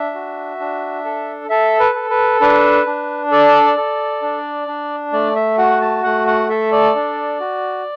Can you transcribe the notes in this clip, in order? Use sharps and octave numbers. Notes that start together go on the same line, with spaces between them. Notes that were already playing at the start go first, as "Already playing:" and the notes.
Already playing: D4 E5
F#4
D4
A4
A4 E5
B4
A4
B4
D4 B4
D4
A4 D5
A4
D4
D4
A3 D5
E5
F#4 F#5
A5
A3 F#5
F#5
A4 E5
D5
D4
F#4